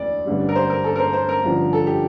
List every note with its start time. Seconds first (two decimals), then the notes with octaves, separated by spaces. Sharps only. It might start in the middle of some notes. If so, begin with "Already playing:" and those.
Already playing: E1 D2 E3 D5
0.26 A1 G2 D3 G3
0.49 A#4
0.56 C5
0.70 A#4
0.84 A4
0.96 A#4
1.00 C5
1.13 C5
1.29 A#4
1.44 A1 G2 D3 F3
1.73 A4
1.87 G4